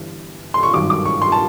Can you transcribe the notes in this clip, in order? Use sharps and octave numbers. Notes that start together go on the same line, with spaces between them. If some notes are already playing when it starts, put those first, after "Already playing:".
Already playing: G1 G2 E3
C6
C#6
G#1 G2 D#3 F#3 D6
D6
C#6
C6
A5